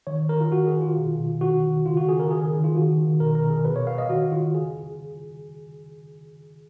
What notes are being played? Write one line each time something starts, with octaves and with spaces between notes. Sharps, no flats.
D#3 C#5
D#3 A#4
F4
D#3 F#4
G#4
D#3
F4
B2
B2
D#3 F#4
D#3
C#3 F4
F#4
C#3 G#4
A#4
D#3 G#4
G#4
D#3
F4
D#3 F#4
D#3
B2 A#4
A#4
B2
G#4
B2 B4
C#5
B2 F5
D#5
D#3 F#4
D#3 F4
C#3 G#4